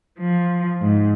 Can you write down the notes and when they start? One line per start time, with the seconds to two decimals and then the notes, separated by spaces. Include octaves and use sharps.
0.19 F3
0.81 G#2